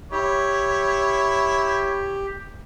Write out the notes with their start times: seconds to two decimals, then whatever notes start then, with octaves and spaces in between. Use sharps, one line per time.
0.12 E4 G4 C#5